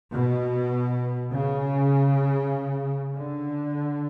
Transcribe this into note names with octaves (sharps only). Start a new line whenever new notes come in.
B2
C#3
D3